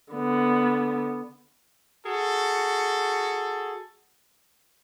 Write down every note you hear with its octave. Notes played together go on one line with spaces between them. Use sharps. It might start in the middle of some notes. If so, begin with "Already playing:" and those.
D3 B3
F#4 G#4 A4